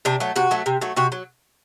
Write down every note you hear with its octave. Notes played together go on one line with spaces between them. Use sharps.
C3 D4
F#3 A3
C3 F#4
F#3 A3
C3
F#3 A3
C3 F#4
F#3